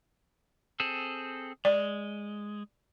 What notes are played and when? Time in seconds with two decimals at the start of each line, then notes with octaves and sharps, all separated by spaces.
0.80 C4 G#4 A4
1.65 G#3 D5